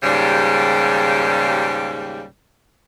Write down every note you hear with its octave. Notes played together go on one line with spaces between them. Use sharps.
D#2 G#2 C#3 G3